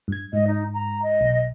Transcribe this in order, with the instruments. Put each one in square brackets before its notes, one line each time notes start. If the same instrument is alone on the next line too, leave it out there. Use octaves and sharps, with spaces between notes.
[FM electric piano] G2 G#6
[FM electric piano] G#2 [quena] D#5
[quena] D#4
A#5
D#5
[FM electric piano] B1